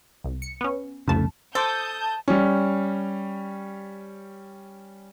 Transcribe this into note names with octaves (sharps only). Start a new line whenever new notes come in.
C2
C#7
B3 C#4
C2 F2 C#3 A3 A5
A4 C5 A5 C6 D6 D#6 G6
G3 C#4